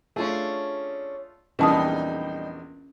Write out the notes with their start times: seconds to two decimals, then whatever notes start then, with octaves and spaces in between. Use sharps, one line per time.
0.16 A3 C#4 D4 F4 G#4
1.59 A#1 E2 E3 G3 C#4 D#4 A5 D#6